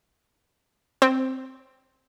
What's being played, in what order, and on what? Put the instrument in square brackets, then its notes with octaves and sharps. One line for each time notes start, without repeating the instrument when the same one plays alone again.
[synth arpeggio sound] C4